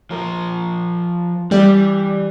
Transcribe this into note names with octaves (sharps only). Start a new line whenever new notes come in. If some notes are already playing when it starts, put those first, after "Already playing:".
F3 A#4
E3 G3 G4 D5